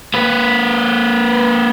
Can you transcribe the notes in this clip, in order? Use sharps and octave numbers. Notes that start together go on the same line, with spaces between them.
A#3 B4